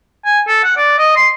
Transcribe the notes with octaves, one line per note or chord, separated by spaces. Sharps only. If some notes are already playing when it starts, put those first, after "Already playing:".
G#5
A4
F#5
D5
D#5
C6